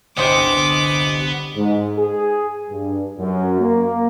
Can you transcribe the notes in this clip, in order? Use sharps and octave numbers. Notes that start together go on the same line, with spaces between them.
G1 C2 B3 G4 C5 D#5 D6
G#2
G#4
G2
F#2
A#3